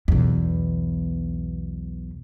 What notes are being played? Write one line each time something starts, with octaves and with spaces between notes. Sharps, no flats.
B1 E2